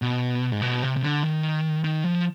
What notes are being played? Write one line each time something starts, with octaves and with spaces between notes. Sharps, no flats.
B2
G#2
B2
C3
C3
D3
D#3
D#3
F3